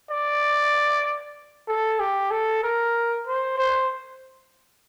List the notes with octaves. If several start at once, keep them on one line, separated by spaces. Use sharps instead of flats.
D5
A4
G4
A4
A#4
C5
C5